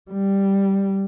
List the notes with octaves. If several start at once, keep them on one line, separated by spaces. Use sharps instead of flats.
G3